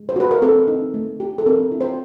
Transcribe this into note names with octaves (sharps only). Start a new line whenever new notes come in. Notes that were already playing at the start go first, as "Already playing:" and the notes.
Already playing: G#3
C5
F#4 B4
A#4
C4 A4
D#4
A3
G4
A4
C4 A#4
E4
C5